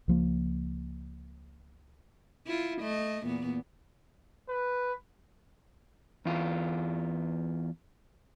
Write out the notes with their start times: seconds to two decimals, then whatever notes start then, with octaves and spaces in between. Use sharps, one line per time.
0.08 C#2 F3 A#3
2.47 E4 F4
2.81 A3 D#5
3.24 E2 A#2 B3
4.49 B4
6.26 E2 F4